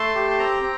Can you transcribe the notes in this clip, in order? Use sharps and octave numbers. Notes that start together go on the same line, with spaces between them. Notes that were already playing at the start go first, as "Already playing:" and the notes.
Already playing: A3 A5 C6
G4
C6
C4 G5 A#5
C4